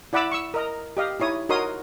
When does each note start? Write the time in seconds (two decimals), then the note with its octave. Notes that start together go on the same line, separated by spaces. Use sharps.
0.13 E4 D5 F#5 B5 D6 E6
0.32 C#6 E6
0.54 A#4 D#5 A#5
0.97 G4 D#5 F5
1.20 D#4 E4 C#5 D#6
1.49 D#4 F#4 A#4 C#5 C6 D#6